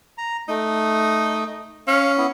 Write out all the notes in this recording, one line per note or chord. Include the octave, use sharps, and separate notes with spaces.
A#5
A3 D#4
C#4 F5
B3 E4